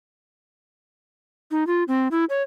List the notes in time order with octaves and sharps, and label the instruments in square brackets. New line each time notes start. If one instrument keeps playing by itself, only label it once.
[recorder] D#4
F4
C4
E4
C#5